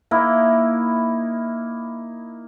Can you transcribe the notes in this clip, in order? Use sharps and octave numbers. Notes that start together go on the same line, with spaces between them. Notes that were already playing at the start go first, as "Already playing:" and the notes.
A#3 D#4 E4